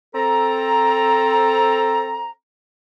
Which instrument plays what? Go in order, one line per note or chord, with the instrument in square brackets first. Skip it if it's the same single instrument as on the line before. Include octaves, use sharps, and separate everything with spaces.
[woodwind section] C4 A4 A#5